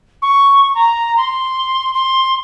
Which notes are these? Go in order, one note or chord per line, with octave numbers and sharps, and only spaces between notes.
C#6
A#5
C6
C6